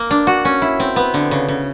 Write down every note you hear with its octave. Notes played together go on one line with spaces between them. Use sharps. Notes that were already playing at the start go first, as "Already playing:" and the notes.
Already playing: A#3
D4
F#4
C#4
E4
C4
B3
D3
C#3
C#3